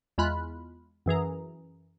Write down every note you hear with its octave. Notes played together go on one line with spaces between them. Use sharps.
E2 G#3 F4 B5 F6 F#6
F#2 E3 G#4 A#5